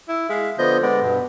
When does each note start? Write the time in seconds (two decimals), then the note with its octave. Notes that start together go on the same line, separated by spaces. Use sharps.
0.09 E4
0.29 G#3 E5 F5
0.59 D3 F3 B3 D#5 G6
0.83 G#3 B3 D5
1.02 G2 B2